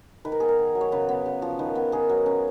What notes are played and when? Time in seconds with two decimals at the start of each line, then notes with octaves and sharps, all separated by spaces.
0.25 D#3 B4
0.32 A#4
0.40 B3 G#4
0.49 A#4
0.59 D#3
0.75 F#3
0.81 C#5
0.92 C#3 B4
1.09 B3
1.26 C#3
1.42 F3
1.59 D#3 B4
1.75 B3
1.92 D#3 G#4
2.09 F#3
2.26 C#4